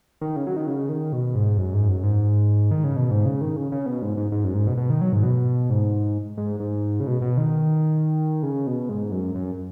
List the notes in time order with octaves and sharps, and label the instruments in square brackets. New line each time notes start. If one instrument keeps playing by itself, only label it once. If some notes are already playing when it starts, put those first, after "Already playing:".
[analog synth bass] D#3
C#3
F#3
D#3
C#3
D#3
B2
G#2
F#2
G#2
F#2
G#2
D#3
C#3
B2
G#2
C#3
D#3
C#3
C#3
B2
G#2
G#2
G#2
F#2
G#2
B2
B2
D#3
F#3
G#2
B2
G#2
G#2
G#2
C#3
B2
B2
D#3
C#3
B2
G#2
F#2
F#2